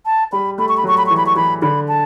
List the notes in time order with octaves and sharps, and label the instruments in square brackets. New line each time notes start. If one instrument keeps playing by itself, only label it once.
[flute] A5
[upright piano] G3 [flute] B5
[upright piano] A3 [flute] B5
[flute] C#6
B5
[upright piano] F#3 [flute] C#6
[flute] B5
[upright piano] E3 [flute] C#6
[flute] B5
C#6
[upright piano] E3 [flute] B5
[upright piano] D3 [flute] B5
[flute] A5